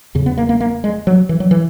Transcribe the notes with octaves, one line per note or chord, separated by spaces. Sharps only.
E2 C#3
B3
A#3
A#3
A#3
G#3
F#3
E3
F#3
E3